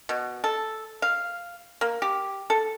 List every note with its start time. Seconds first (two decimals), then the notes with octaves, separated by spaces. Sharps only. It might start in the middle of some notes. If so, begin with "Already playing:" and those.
0.09 B2
0.44 A4
1.02 F5
1.81 A#3
2.02 G4
2.50 A4